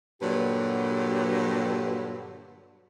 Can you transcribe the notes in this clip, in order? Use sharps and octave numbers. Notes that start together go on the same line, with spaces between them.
G2 A#2 D3 F#3 G4 B4